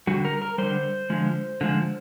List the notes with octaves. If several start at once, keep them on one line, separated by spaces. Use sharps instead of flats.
D3 G3 F#4
A#4
A#4
D3 G3 C5
D3 F3 G#3
D3 F3 G#3